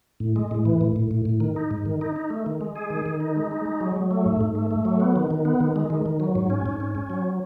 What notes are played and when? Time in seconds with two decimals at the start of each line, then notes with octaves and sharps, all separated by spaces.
0.20 A2
0.36 G#3
0.51 A2
0.65 E3
0.81 A2
0.96 A2
1.11 A2
1.25 A2
1.40 D#3
1.56 D#4
1.71 G#2
1.86 D#3
2.01 D#4
2.16 D#4
2.30 A3
2.46 D#3
2.61 G#3
2.75 G#4
2.90 D#3
3.06 D#3
3.20 D#4
3.36 G#3
3.51 D#4
3.65 G#3
3.80 F#3
3.96 F#3
4.11 A3
4.26 G#2
4.41 G#2
4.55 A3
4.71 A3
4.85 F#3
5.00 B3
5.16 D#3
5.31 D#3
5.45 B3
5.60 D#3
5.76 G#3
5.90 D#3
6.06 D#3
6.20 F#3
6.35 G#2
6.50 C#4
6.66 G#2
6.80 C#4
6.95 C#4
7.10 F#3